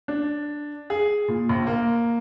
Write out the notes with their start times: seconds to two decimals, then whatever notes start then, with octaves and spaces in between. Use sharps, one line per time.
0.08 D4
0.90 G#4
1.28 A#2
1.49 A#1
1.67 A#3